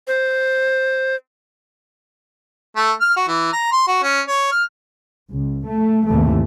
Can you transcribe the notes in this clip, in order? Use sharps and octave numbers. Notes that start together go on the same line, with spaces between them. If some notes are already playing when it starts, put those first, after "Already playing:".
C5
A3
F6
F#4
E3
A#5
C6
F#4
C#4
C#5
F6
C#2
A3
D#2 G#2 C3 E3 A3